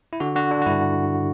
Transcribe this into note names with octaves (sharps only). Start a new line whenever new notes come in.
E4
D3 F#4
D3 F#4
D3 D4
F#4
G2 E4